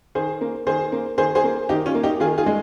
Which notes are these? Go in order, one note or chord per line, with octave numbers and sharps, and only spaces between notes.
D#3 G#4 C5
A#3
D#3 G#4 C5
A#3
D#3 G#4 C5
G#4 C5
A#3
D#3 D#4 G4
C#4 F4
A#3
D#4 G4
D#3 F4 G#4
F4 G#4
G#3